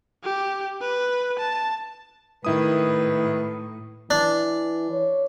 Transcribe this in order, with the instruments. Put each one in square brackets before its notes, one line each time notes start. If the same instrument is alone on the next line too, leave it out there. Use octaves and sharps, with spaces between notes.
[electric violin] G4
B4
A5
[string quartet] A2 [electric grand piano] D#3 E4 D#6 [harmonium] B4
[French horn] E3 [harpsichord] D4
[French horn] C#5